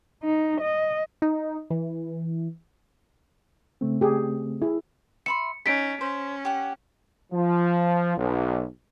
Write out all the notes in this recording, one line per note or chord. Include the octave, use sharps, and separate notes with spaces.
D#4
D#5
D#4
E3
C#3 A3 C4
G4 G#4
E4 G#4
E5 B5 C6 C#7
C#4 D#4 B6 D7
C#4 C5
G4 F#5
F3
B1